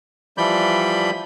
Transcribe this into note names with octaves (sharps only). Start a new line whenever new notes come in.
E3 F3 G3 D5 B5 G6